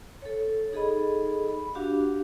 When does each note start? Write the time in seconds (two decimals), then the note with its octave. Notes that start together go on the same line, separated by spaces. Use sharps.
0.22 A4 C#5
0.72 D#4 G#4 A4 D#5 B5
1.49 B5
1.75 D4 F#4 G4 F5 F#5